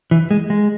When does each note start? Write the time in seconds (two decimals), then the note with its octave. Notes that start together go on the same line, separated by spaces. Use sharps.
0.11 E3
0.31 G#3
0.50 G#3